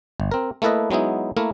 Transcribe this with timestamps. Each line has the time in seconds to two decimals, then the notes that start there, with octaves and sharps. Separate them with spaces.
0.20 G1
0.31 C4 A#4
0.62 A3 A#3 E4 A4 B4 D#5
0.91 F#3 G#3 B3 D#4 E4
1.37 A3 A#3 E4 A#4